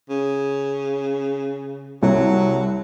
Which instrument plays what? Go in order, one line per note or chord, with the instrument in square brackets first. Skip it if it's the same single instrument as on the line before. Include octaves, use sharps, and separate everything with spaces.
[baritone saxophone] C#3
[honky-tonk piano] C2 [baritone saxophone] F#3